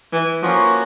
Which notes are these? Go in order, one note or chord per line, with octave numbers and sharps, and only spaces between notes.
E3
F3 A#3 C#4 F#4